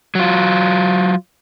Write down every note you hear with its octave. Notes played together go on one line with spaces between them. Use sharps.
F#3 F4